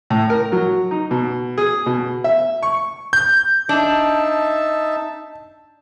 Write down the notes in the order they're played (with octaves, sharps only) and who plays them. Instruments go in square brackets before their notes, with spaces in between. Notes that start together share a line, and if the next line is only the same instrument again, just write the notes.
[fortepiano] A2
A#4
F#3
D#4
B2
G#4
B2
E5
C#6
[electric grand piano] G6
[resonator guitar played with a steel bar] D4 [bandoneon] D#4 E5 A5